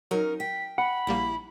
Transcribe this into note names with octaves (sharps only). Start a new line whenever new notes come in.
F#3 C#4 D#4 A#4
G5 B6
F#5 B5
A#1 G3 A#3 E4